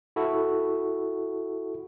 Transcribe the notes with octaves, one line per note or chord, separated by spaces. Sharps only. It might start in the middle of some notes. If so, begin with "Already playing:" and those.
E4 F#4 A4